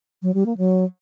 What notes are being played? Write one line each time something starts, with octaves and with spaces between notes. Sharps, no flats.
F#3
G3
A#3
F#3